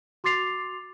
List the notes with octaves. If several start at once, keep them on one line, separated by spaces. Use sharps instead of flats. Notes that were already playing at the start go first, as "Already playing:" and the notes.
F#4 C6 D6 A6 C7 F7